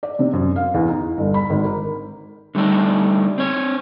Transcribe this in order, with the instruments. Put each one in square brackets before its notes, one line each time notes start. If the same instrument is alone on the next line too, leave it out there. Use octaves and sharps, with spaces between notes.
[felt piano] D5
C3
F#2
F5
E2
D#4
G1
B5
G#1
A#4
[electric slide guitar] D3 G3 A3 D4 D#4
C4 C#5